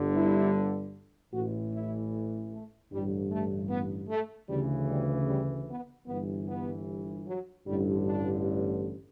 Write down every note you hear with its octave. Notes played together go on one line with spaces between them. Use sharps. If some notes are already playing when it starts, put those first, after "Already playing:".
Already playing: G1 G2 D3
E4
A1 A2 E3 F#4
E4
A3
A1 G2 D3 G3
A3
B3
A3
D2 C#3 E3 G3
G3
G3
B3
G1 G2 E3 B3
B3
F#3
A1 G2 D3 G3
D4